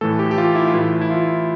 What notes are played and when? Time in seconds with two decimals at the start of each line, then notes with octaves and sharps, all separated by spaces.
0.01 A2 E3 A3 A4
0.19 G4
0.31 G4
0.38 F4
0.55 E4
0.68 F4
0.74 A2 E3 A3 E4
1.01 E4
1.10 F4